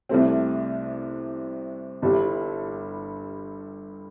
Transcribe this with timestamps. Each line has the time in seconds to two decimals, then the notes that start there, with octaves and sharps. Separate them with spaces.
0.09 C2 C3 A3 C4
2.02 G1 G2 G3 E4 G4